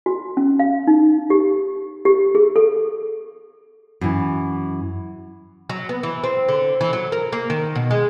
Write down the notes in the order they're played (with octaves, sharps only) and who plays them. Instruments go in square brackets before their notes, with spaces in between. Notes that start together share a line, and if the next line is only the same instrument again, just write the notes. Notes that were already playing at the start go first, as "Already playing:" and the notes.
[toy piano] F#4
C#4
F5
D#4
G4
G4
G#4
A4
[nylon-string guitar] F#2 E3
[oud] F#3
B3
E3
C4
D3
E3
F#3
A#4
A#3
D#3
B2
G#3